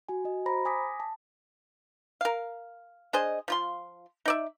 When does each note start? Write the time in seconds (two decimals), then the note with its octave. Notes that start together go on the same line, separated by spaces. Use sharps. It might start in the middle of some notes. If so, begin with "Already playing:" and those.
0.09 F#4 G#5
0.24 F#4 D#5
0.46 C5 A#5 B5 A#6
0.65 G#5 D6 D#6 A#6 B6
1.00 A5
2.21 A#4 F5
3.13 D4 G#4 C5 D#5
3.48 F3 F4 C6
4.25 D#4 D5 E5